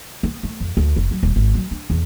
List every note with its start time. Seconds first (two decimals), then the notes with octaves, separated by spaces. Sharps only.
0.23 B3
0.43 A3
0.60 F2
0.77 D2
0.96 F1
1.11 F#3
1.23 D#1
1.36 G#1
1.55 F#3
1.71 D4
1.90 E2